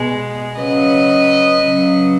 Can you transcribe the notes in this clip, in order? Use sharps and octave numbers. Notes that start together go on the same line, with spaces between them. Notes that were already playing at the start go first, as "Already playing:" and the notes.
Already playing: B2 G#3
C#3 F#3 B4 D#5
C#3 F#3